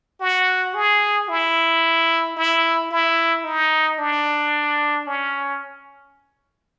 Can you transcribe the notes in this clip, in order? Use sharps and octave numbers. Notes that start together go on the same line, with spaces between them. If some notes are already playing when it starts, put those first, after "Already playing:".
F#4
G#4
E4
E4
E4
D#4
D4
C#4